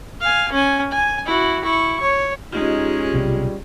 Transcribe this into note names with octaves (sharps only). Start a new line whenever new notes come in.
F5 G#5
C#4 G#5
G#5
E4 F#4
E4 C#6
C#5
G#3 C#4 D#4 F4 G4 G#4
B1 C3 G3